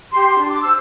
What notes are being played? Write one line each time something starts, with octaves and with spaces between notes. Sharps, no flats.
G4 C6
D4
D6
C5 E6